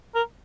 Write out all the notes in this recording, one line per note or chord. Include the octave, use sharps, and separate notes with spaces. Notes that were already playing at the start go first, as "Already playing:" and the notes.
A#4